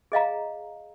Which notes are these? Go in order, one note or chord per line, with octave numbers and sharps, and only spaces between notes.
G#4 D#5 F5 A#5